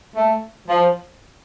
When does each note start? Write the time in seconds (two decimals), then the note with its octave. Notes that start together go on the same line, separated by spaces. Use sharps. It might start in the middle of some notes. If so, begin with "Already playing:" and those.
0.15 A3
0.68 F3